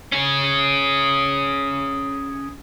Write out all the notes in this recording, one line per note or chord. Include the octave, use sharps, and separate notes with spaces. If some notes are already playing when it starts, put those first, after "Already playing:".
C#4 G#4